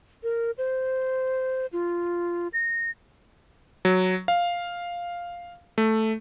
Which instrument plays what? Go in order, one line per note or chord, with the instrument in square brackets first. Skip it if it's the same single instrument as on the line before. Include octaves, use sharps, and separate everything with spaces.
[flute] A#4
C5
F4
A#6
[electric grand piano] F#3
F5
A3